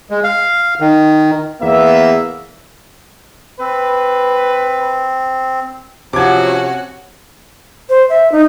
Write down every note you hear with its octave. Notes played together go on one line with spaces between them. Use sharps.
G#3
F5
D#3
E2 A#3 B3 E5
C4 B4
C3 F3 F#3 C#4 F#4 D6 G#6
C5
E5
D#4